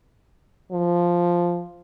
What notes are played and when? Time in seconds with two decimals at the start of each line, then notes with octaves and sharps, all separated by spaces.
0.71 F3